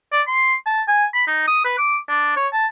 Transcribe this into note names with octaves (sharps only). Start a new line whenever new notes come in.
D5
C6
A5
G#5
B5
D#4
D#6
B4
D6
D4
C#5
A5